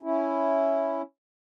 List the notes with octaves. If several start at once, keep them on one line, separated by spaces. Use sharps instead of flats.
C#4 E4